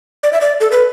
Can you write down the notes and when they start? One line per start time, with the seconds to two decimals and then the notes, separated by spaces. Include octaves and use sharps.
0.23 D5
0.33 E5
0.41 D5
0.61 A4
0.71 B4